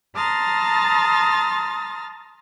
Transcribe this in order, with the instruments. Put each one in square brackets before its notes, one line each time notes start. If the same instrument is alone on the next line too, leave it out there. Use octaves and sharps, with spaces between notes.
[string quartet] A5 A#5 C6 D#6 F6 A6